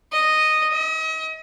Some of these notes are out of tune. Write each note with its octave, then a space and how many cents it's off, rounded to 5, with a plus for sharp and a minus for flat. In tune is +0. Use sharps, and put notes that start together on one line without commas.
D#5 -5
D#5 +40